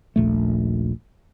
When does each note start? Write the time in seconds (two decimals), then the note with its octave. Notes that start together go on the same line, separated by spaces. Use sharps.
0.16 D#1 A#1 A3